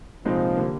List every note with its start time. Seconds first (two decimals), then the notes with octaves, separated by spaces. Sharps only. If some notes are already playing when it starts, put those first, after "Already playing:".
0.25 C2 A#2 F3 G#3 C4 D#4
0.57 D3 G3 A#3